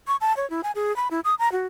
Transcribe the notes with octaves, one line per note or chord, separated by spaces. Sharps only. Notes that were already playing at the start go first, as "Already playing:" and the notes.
C#6
A5
C#5
E4
G#5
G#4
B5
E4
D#6
A#5
F#4